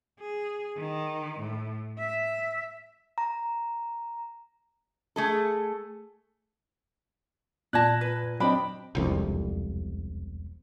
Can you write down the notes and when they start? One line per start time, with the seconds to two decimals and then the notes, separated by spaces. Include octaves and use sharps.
0.20 G#4
0.77 D#3
1.40 A2
1.99 E5
3.18 A#5
5.16 A3 G#4 A4
7.73 A#2 D5 A5 F#6 G#6 A#6
8.01 B4
8.40 F#3 C4 D4 D#5 G5 B5
8.95 E1 C2 F2